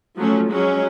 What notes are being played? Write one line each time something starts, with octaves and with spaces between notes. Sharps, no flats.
F3 F#3 A3 C#4
F#3 G#3 C#4